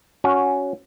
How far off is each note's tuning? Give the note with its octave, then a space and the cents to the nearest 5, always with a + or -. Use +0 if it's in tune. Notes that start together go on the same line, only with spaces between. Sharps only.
C#4 +10 F#4 -10